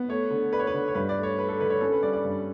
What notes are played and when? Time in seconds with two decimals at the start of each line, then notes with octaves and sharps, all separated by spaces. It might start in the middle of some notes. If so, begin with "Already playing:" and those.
Already playing: B3
0.09 A3 C#5
0.30 D3
0.52 D4 B4
0.59 C#5
0.67 B4
0.74 D3
0.88 C#5
0.95 G2 B4
1.09 D5
1.17 A3
1.23 C#5
1.38 A3 B4
1.48 A4
1.60 D3 B4
1.70 C#5
1.81 C#4 A4
1.92 B4
2.03 G3 D5
2.13 D5
2.25 G2